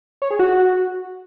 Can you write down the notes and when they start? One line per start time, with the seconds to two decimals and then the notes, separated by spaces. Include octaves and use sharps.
0.22 C#5
0.30 G#4
0.39 F#4